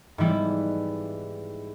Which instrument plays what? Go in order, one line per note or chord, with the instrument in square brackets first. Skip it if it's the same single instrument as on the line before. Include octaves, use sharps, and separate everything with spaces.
[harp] G#2 E3 G3 B3 E4